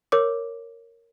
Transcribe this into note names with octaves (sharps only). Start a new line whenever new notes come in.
A#4 C#5 D6